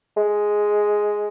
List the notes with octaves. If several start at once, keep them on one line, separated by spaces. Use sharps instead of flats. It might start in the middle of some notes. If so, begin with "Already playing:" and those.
G#3